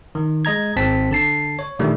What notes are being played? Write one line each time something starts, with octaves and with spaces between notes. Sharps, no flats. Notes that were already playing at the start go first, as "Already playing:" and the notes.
D#3
G#3 D#5 A#5 G#6
G#1 C4 A5 B6
D3 A5 C7
C#5
A#2 D3 D#3 G3 A3